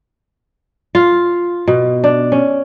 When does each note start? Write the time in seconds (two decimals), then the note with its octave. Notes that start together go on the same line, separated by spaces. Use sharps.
0.95 F4
1.68 B2
2.04 D4
2.32 C#4